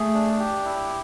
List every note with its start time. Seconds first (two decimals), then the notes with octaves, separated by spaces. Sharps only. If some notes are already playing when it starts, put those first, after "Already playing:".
Already playing: A3 G#4
0.14 D4
0.39 G4
0.65 E4